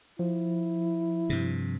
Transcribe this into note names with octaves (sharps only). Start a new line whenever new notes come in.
F3 E4
G2 C3